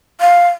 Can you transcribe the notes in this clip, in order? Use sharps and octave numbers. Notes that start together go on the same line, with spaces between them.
F5